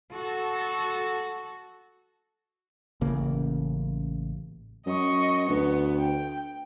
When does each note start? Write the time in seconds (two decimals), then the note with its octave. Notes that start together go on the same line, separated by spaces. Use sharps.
0.12 F#4 A4
3.01 A1 C#3 A#3
4.86 F#2 D#5 C#6
5.49 D2 B3
5.99 G5